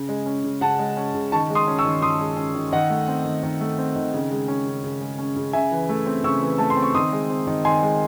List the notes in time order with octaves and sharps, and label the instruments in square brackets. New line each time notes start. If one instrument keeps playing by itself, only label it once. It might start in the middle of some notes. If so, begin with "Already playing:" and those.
Already playing: [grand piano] C#3
G#3
C#4
C#3
C#3 F#5 A5
G#3
C#4
C#3
D#3 A5 C#6
G#3
C6 D#6
C#4
C#6 E6
D#3
D#3 C6 D#6
G#3
C#4
D#3
D#3 D#5 F#5
A3
C4
D#3
D#3
A3
C4
D#3
C#3
G#3
C#4
C#3
C#3
G#3
C#4
C#3
C#3 E5 G#5
E3
A3
C4
C#3 C#6 E6
E3
A3 A5
C6
C4
C#6
D#3 C6 D#6
G#3
C4
D#3
D#3 G#5 C6
G#3